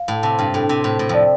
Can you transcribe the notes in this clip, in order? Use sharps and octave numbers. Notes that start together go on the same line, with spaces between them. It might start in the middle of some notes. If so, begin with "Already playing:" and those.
Already playing: F5
A2
C3 A5
G2
A2 A4
C3
A2 C5
A2
F2 D5